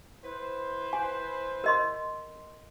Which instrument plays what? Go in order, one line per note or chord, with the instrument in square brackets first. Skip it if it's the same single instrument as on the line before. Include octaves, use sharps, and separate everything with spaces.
[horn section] E4 B4 C5
[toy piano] G#5
A#4 D#5 C6